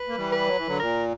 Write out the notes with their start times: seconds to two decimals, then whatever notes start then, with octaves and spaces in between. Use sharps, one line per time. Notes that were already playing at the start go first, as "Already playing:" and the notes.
Already playing: B4
0.09 A#3
0.16 E3 G3
0.33 B4
0.47 F#3
0.58 E3
0.67 D3 F#3
0.80 A#2 A#4